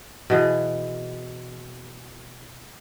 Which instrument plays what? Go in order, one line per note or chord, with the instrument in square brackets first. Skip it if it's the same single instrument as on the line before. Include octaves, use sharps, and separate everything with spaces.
[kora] B2 E3 G#4